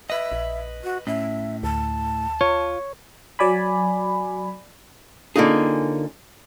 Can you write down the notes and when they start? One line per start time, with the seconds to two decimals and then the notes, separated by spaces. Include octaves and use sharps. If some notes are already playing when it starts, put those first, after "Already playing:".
0.10 B4 D#5 E5
0.32 A#1
0.84 F#4
1.07 A2 C#4 E5
1.63 D2 A5
2.41 F4 C#5
3.39 F#3 D5 G#5 B5
5.36 D3 A#3 C#4 D#4 F4 G#4